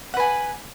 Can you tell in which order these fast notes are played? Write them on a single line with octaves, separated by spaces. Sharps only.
F#5 B4 G#5